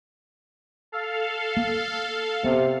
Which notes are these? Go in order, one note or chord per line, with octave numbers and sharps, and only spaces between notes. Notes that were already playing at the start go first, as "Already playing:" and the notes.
A4 F5
A#3
C3 B3